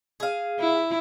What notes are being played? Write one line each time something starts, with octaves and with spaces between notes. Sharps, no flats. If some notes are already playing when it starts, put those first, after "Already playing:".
G#4 F5
E4